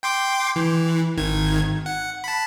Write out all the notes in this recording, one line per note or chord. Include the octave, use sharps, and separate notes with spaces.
G5 C6 D6
E3
G#1 D#3 G#6
F#5
A5 B5